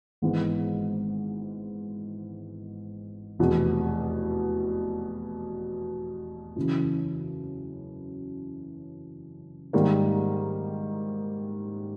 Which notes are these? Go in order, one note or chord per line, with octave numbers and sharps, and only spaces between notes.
G#1 G#2 E3 G#3 B3
F1 E2 B2
F#2 C#3 E3
G#2 D#3 G3 A#3